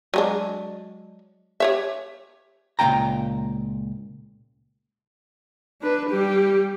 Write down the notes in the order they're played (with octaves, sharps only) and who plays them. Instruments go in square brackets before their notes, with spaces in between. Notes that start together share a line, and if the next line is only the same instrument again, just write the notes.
[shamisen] F#3 G#3 D4
G4 C#5 E5
[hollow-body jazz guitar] C#2 A#2 C4 F5 G5 A#5
[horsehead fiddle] D4 B4
G3 G4